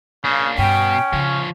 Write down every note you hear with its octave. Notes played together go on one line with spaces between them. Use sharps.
C#3 A#3 D4
G2 B2 C#4 G5
C#3 F3 C#5